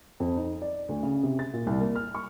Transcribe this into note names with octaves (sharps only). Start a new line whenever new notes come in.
F2
D#4
D5
D2
C#3
C3
A6
A#2
C2
A#3
F6
C#6